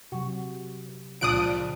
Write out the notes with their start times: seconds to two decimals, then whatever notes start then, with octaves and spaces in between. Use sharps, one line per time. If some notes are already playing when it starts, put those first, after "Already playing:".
0.12 C3 F#3 F#4
1.21 C#2 A#2 C#3 F3 D4 D#6 F#6 D7